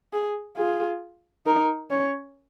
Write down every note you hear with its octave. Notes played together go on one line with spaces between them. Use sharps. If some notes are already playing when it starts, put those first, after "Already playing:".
G#4
F4 G#4
D#4 A#4
C#4 C#5